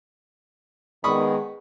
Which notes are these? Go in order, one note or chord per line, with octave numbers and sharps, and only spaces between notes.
D#3 G#3 B3 B5 C#6 D#6